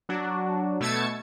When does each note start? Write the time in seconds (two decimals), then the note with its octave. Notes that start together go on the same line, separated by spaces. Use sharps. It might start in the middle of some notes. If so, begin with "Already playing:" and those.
0.09 F#3 D4 F#4
0.80 B2 A3 E6 G#6 A6 C#7